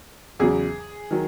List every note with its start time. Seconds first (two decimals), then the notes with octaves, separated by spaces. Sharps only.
0.40 E2 C#3 F#3 G#4
1.11 D#3 F#3